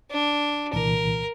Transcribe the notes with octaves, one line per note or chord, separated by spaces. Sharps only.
D4
C2 A#2 E3 A#4